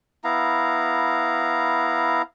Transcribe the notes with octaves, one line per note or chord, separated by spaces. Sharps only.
B3 E4 F5 A#5